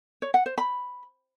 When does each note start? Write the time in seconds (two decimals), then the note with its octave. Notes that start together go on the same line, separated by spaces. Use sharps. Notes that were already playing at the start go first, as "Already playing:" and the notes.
0.22 C#5
0.34 F#5
0.46 C5
0.58 B5